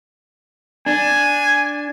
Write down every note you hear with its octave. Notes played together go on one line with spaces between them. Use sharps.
D4 G#5